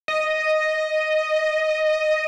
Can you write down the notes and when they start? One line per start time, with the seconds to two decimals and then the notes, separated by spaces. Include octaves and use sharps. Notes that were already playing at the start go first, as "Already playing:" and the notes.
0.08 D#5